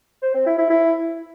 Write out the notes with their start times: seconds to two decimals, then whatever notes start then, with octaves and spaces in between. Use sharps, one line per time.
0.22 C5
0.34 C4
0.46 E4
0.58 E4
0.70 E4